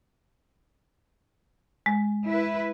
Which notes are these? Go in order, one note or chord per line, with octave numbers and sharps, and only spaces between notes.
G#3
E4 B4